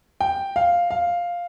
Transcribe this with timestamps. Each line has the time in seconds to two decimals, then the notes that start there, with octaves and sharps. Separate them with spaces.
0.20 G5
0.56 F5
0.91 F5